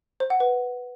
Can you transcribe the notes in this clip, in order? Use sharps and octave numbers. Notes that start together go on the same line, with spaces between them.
C5
F#5
B4